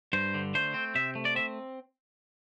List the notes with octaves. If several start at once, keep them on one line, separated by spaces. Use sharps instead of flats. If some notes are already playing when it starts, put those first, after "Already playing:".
G2 C5
D3
A3 C5
C4
C3 E5
A3
D5
C4 E5